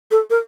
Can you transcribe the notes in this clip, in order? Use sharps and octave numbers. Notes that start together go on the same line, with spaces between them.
A4
A#4